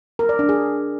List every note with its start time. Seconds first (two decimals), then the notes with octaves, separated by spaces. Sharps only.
0.19 A#4
0.29 D5
0.39 D4
0.49 G#4